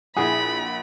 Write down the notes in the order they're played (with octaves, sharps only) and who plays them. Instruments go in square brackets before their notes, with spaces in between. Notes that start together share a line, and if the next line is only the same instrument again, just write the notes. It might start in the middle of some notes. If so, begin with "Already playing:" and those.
[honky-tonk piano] A#1 F#5 [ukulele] E4 G#4 [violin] B5